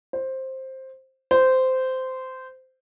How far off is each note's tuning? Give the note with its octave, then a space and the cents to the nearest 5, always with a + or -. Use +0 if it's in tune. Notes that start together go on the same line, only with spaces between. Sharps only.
C5 +10
C5 -15